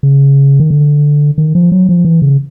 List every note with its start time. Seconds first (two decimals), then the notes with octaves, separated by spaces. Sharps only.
0.03 C#3
0.60 D#3
0.70 D3
1.38 D#3
1.55 F3
1.72 F#3
1.89 F3
2.05 E3
2.22 C#3